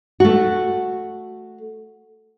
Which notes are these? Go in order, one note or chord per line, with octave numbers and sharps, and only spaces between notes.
A3 F#4